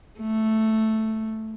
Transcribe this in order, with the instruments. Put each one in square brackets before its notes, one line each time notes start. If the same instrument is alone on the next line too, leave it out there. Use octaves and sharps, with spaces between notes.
[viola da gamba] A3